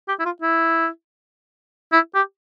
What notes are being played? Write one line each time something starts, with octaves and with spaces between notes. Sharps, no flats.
G4
E4
F4
E4
E4
G4